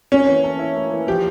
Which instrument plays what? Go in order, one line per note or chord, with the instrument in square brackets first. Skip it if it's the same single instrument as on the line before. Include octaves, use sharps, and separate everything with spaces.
[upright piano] A#3 [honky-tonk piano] C#4
[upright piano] E3
A4
E4
A#3
E3
[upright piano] F3 [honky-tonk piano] G4